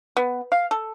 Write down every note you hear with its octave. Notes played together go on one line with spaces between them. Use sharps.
B3
F5
A4